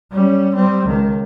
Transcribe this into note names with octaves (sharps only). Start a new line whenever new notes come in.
G3 C#4
G3 C4
C#2 D#3